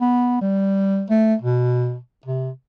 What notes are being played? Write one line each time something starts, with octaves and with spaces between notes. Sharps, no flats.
B3
G3
A3
B2
C3